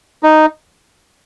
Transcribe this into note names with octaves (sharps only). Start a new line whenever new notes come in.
D#4